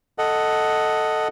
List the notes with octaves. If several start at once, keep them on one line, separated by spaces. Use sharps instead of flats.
A4 D#5 F#5